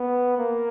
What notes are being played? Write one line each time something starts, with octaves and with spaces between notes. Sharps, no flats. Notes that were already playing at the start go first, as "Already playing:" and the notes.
Already playing: B3
A#3